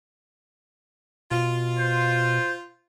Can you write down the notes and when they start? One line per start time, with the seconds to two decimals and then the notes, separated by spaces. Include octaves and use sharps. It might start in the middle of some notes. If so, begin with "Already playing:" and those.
1.31 B2 F4
1.78 C5